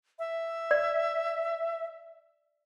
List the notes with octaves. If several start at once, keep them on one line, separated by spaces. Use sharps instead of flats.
E5
D5